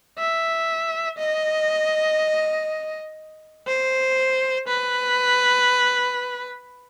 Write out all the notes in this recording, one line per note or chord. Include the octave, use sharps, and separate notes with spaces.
E5
D#5
C5
B4